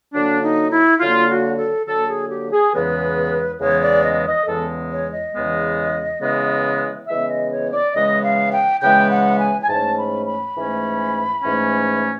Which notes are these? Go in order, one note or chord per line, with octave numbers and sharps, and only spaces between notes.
D3 F#3 A#3 D4
D#4
E4
D3 F#3 A#3 F4
F#4
A4
D3 F#3 A#3 A4
G#4
G4
G#4
E2 C#3 E3 G#3 B3 B4
E2 C#3 E3 G#3 B3 C#5
D5
D#5
D#5
E2 C#3 E3 G#3 B3 A4
C#5
D#5
E2 C#3 E3 G#3 B3
C#3 E3 G#3 B3
C#3 E3 G#3 B3 E5
D#5
C#5
D5
C#3 E3 G#3 B3 D#5
F5
G5
C#3 E3 G#3 B3 G5
F#5
G#5
G#5
G#2 E3 A3 C#4 A5
B5
B5
G#2 E3 A3 C#4
G#2 E3 A3 C#4